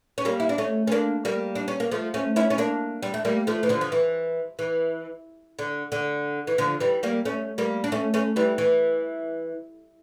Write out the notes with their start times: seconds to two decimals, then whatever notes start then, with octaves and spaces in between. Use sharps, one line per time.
0.18 C#4
0.25 G3 A#3
0.40 E4
0.49 D4
0.58 A3 C#4
0.87 C#4
0.92 A#3 D4
1.25 G3 A#3
1.55 D4
1.68 C#4
1.80 A#3
1.91 F3 A3
2.14 A3 C#4
2.36 C#4 E4
2.50 C#4
2.58 A#3 D4
3.02 G3
3.14 A3
3.25 G3 A#3
3.47 F3 A3
3.63 E3
3.69 D3 F3
3.81 F3
3.92 E3
4.59 E3
5.59 D3
5.92 D3
6.47 E3
6.58 D3 F3
6.80 E3 G3
7.03 G3 A#3
7.25 A3 C#4
7.58 G3 A#3
7.84 D4
7.92 A3 C#4
8.14 A3 C#4
8.36 E3 G3
8.58 E3